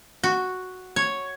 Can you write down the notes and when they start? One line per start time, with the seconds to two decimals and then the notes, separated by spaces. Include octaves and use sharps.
0.24 F#4
0.96 C#5